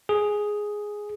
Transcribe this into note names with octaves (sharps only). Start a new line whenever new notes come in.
G#4